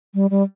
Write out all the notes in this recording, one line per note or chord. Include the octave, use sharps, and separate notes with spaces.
G3
G3